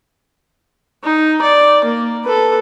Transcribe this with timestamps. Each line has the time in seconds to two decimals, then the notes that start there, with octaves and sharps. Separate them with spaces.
1.04 D#4
1.42 D5
1.84 A#3
2.24 A4 B4